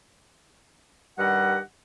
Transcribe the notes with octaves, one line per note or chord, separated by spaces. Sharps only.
G2 D#3 G3 G4 D#5 F#5